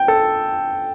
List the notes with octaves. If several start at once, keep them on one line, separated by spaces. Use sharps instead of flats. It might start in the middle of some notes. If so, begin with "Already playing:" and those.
Already playing: G5
A4